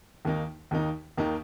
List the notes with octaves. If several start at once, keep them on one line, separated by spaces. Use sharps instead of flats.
D#2 D#3 A#3 D#4
D#2 D#3 A#3 D#4
D#2 D#3 A#3 D#4